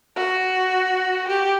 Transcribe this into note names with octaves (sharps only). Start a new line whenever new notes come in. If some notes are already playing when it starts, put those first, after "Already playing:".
F#4
G4